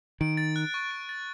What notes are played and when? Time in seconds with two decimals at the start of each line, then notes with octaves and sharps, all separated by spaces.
0.21 D#3 D7
0.37 A6
0.56 F#6
0.74 C#6
0.91 D7
1.09 A6